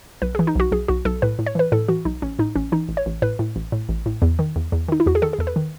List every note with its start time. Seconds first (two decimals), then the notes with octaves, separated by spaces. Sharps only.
0.22 B1 B4
0.35 E3 G#4
0.47 D#4
0.56 B1 F#4
0.72 B1 G#4
0.88 B1 F#4
1.05 B1 A4
1.22 A2 B4
1.39 A2
1.46 C#5
1.55 E3 B4
1.72 A2 A4
1.88 E3 F#4
2.05 B1 D#4
2.22 A1 C#4
2.39 A2 D#4
2.56 A1 C#4
2.72 E3 D#4
2.89 A1
2.97 C#5
3.06 A1
3.22 A2 B4
3.39 A2
3.56 A1
3.72 A2
3.89 A1
4.06 A2
4.22 E2
4.39 D#3
4.56 E2
4.72 E2
4.88 D#3 D#4
5.00 E4
5.06 E2 F#4
5.15 G#4
5.22 D#3 A4
5.33 G#4
5.39 E2 A4
5.47 B4
5.56 D#3